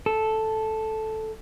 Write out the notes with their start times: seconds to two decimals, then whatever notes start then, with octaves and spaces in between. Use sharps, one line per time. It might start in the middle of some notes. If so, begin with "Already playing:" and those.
0.06 A4